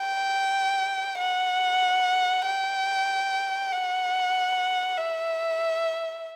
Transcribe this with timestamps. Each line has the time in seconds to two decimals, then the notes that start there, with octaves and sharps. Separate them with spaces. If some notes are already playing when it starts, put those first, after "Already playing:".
Already playing: G5
1.18 F#5
2.45 G5
3.71 F#5
4.97 E5